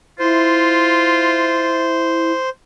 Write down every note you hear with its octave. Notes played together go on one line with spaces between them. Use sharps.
E4 F4 C5